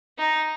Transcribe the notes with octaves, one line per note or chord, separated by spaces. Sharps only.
D#4